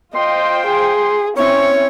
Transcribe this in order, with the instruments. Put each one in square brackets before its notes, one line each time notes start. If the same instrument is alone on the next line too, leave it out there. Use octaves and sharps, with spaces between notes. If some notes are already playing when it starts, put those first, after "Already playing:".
[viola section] F4 C5 G5 [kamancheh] D#5 [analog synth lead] C6
[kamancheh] G#4
[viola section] C4 C#4 [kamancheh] E4 [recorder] C#5 [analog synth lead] C#6